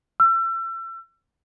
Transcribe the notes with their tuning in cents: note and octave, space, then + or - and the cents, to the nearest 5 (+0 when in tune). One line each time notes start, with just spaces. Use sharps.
E6 +35